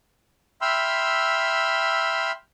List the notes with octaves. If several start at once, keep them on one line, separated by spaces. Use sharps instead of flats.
E5 G5 B5 C6 E6 F6